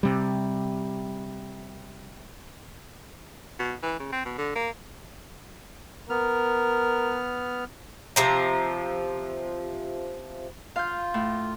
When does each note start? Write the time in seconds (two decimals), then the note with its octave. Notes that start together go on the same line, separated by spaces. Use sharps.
0.03 C3 G3
3.59 B2
3.83 E3
3.99 C#3
4.12 C4
4.25 B2
4.38 D3
4.55 A#3
6.10 B3 A#4 F6
8.16 C3 F3 A#5
10.76 F4 F5 G6
11.14 A2